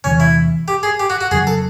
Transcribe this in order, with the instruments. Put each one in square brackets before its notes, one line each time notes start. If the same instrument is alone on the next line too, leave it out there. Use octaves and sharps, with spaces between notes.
[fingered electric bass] E2 C3 E3 [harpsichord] C#4
[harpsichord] E4
G4
G#4
G4
F#4
F#4
[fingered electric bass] F2 C#3 F#3 [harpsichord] G#4
[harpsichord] A4